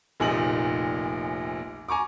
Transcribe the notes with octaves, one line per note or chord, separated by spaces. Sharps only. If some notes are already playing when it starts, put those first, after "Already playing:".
F1 A#1 A#2 D#4 F#7
G#5 A#5 C#6 D6